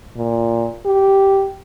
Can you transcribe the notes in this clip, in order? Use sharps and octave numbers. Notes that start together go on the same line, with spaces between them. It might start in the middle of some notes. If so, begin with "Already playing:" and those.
A#2
G4